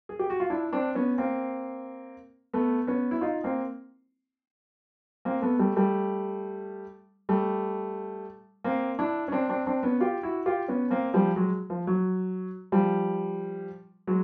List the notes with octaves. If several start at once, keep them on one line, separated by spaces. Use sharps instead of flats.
G#4
G4
F#4
F4
D4 E4
C4 D4
B3 C#4
A#3 C4
A3 B3
B3 C#4
E4
D#4 F4
A#3 C4
A#3 C4
A3 B3
G3 A3
G3 A3
G3 A3
A#3 C4
D4 E4
C#4
C4 D4
C4 D4
C4 D4
B3 C#4
F4 G4
E4 F#4
F4 G4
B3 C#4
A#3 C4
F3 G3
F#3 G#3
F3
F#3
F3 G3
F#3 G#3